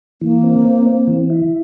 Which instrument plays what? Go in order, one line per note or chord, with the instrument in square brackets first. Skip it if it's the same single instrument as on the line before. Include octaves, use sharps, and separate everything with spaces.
[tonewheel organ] E3 [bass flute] A#3
[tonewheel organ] C4
C4
C4
E3
E4